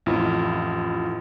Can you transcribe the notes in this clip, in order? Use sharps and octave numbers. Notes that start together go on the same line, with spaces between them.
A1 F2 E4 F4